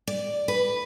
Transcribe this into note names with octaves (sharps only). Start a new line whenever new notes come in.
D5
B4